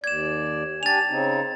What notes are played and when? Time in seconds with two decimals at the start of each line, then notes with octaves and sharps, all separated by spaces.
0.04 D#2 D5 G#6 E7
0.83 D4 G4 G#5 A6 F7
1.09 C#3 C4 D#4